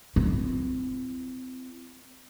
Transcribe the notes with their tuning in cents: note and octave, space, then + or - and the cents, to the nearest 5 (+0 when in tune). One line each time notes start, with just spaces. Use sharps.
C4 -30 E4 +30